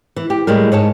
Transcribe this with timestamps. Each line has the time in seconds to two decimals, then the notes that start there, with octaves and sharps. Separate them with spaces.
0.16 E3
0.30 G4
0.47 A2 G3 G#3 A#4
0.72 G#2 C#5 A5